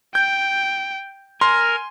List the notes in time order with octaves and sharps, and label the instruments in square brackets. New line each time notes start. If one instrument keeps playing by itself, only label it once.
[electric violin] G5 [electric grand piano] G6
[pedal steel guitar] A#4 [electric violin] G#5 [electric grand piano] C6